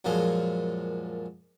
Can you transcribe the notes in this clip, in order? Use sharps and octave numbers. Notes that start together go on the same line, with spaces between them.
F#2 A#2 F3 G#3